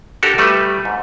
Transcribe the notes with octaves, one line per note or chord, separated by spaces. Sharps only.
D4 F#4 G4 A4 A#4
G3 A3 B4
G#2